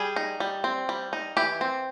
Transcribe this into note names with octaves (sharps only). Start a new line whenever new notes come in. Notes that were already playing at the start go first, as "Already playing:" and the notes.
Already playing: G3 G#4
D#4
G3
C4
G3
D#4
E3 G4
C4